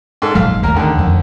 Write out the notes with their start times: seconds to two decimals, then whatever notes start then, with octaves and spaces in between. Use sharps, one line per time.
0.22 G#2 A4
0.35 A#1 G#2 F#3 F5
0.63 D#2 A3 A#3 A#4
0.77 D3 D#3
0.99 F2